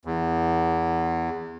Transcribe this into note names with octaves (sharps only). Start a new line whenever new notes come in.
E2